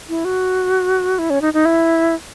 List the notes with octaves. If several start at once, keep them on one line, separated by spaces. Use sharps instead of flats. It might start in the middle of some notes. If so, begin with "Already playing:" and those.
E4
F#4
E4
C#4
D#4
D#4
E4